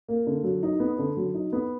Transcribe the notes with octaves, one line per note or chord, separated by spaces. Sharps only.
A#3
D3
F#3
D#4
B3
D3
F#3
D#4
B3